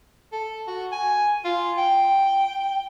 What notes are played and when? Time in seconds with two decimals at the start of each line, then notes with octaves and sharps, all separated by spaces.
0.32 A4
0.67 F#4
0.92 G#5
1.45 F4
1.77 G5